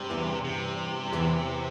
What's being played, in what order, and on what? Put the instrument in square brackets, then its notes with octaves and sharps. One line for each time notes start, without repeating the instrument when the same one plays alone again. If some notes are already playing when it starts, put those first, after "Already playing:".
Already playing: [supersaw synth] G2 G3 [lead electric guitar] C3
[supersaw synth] E2 E3
[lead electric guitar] C3
[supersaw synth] E2 E3